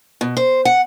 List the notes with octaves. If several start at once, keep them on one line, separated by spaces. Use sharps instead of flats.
B2
C5
F#5